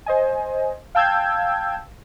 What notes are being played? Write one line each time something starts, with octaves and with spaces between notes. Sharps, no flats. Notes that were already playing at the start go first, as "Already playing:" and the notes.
C5 D#5 G#5
F5 G5 A5 E6 G6 G#6